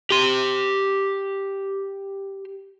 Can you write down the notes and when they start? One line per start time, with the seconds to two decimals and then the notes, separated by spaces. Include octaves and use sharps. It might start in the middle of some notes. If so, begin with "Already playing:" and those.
0.11 G4 C6